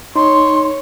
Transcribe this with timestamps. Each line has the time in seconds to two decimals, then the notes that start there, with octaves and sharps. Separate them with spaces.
0.16 D#4 C#5 C6